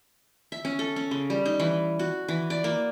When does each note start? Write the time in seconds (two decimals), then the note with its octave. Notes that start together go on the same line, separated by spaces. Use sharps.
0.52 E5
0.65 C#4
0.79 A4
0.96 C#4
1.11 C#3
1.30 G3
1.46 D#4
1.60 E3
1.99 F#4
2.28 E3
2.50 D5
2.64 A#3